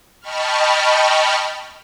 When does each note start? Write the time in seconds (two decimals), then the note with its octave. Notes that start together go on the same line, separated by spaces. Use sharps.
0.20 D#5 G5 A5 B5 C#6 F6